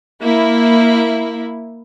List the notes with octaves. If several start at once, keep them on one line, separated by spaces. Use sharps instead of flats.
A#3 E4